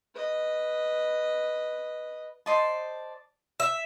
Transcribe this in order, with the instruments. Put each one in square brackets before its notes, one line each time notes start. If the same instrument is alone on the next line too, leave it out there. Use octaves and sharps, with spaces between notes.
[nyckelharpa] B4 D#5
[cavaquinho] C5 D5 D#5 A5
[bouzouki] E5